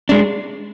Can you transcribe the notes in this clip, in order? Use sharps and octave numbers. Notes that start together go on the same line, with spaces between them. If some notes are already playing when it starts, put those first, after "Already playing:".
G#3 D4